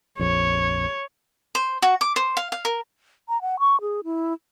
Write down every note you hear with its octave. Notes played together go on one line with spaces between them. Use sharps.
A#1 F2 C#5
C5
F#4
D6
C5
F5
F5
A#4
A#5
F#5
C#6
G#4
E4